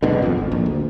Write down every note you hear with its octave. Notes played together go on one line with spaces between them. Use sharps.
F#1 G#2 B2 D3
D#1 A#1 F2
G#1
A#1
D2